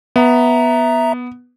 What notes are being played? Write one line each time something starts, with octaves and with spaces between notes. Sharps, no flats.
B3 E5 A#5